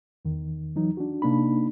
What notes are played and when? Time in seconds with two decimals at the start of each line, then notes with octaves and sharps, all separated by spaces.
0.25 E2 D#3
0.76 E3 F#3 D#4
0.97 D4 F#4
1.22 C3 A#3 D4 D#4 B5